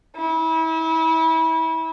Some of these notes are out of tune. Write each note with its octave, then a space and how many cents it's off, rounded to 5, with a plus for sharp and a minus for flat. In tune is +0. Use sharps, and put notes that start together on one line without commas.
E4 -30